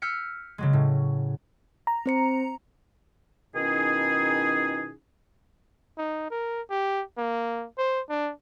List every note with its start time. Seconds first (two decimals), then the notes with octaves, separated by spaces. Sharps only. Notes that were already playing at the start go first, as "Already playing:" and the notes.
0.02 E6 F6 G6 B6 C#7
0.58 C#3 F#3 G#3
0.73 A2
1.87 A#5
2.06 C4 C5 C#7
3.55 B2 D#3 C#4 D#4 E4 G#4
5.98 D#4
6.31 A#4
6.70 G4
7.17 A#3
7.78 C5
8.09 D4